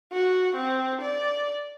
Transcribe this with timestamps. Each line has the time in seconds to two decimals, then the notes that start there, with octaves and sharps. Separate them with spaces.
0.13 F#4
0.56 C4
1.02 D5